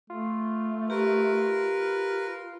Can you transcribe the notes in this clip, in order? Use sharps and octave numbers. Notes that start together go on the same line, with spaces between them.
A3 F4
G4 A#4 B4